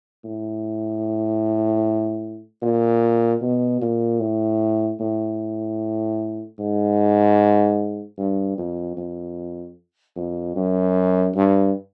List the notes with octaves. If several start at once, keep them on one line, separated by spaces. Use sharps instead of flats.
A2
A#2
B2
A#2
A2
A2
G#2
G2
F2
F2
F2
F#2
G2